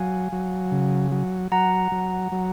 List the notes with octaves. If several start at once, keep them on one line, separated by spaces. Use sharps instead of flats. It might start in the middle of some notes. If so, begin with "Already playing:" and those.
Already playing: F#3 F5 G#5
F#3
C#3
F#3
F#3 F#5 A#5
F#3
F#3